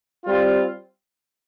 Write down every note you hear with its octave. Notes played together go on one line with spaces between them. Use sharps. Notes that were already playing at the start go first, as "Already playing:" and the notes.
G3 C4 F4